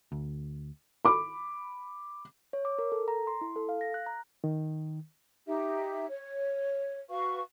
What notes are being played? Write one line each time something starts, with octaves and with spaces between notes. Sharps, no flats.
D2
B5 D6
C#5
D6
A#4
A4
A#5
C6
E4
A4
F5
A#6
F#6
A#5
D#3
D#4 G4 E5
C#5
F#4 B4 F5 C#6